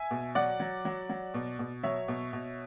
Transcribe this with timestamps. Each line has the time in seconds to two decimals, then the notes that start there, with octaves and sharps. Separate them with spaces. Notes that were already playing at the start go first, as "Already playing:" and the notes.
Already playing: E5 G#5
0.11 B2
0.35 F#3 D5 F#5
0.60 F#3
0.85 F#3
1.10 F#3
1.34 B2
1.59 B2
1.83 F#3 C#5 E5
2.08 B2
2.33 B2